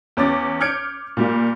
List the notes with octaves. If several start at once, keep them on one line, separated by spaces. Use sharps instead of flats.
E2 C#4 D6 A6
D6 F6 G6 G#6 C#7 D7
A#2 G3 A#3